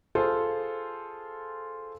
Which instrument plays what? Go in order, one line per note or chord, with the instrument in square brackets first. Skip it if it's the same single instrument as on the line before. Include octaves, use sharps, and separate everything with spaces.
[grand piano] F4 G#4 A4 C5